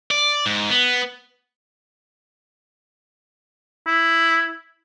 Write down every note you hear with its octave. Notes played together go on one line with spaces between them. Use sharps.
D5
G#2
B3
E4